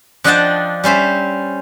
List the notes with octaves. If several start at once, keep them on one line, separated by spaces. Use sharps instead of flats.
F3 D4 D#5 F#5 G5 A5
G3 C#4 C5 E5